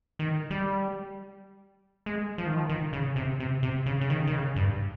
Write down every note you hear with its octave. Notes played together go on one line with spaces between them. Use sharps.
D#3
G3
G#3
F3
D#3
F3
D#3
C#3
C3
C3
C3
C#3
C#3
D#3
D#3
C#3
G2